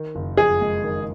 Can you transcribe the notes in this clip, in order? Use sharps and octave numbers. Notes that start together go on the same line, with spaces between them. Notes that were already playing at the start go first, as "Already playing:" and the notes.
Already playing: D#3
F#1
F2 G#4
G#3
D#3